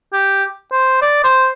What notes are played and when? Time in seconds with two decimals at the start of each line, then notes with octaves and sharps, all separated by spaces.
0.13 G4
0.72 C5
1.02 D5
1.24 C5